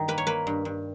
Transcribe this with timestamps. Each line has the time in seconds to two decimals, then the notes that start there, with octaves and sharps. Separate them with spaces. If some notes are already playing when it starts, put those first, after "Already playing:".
Already playing: G2 D#3
0.08 A#3 B4
0.18 C#5
0.27 A#3 B4
0.47 G2
0.65 G2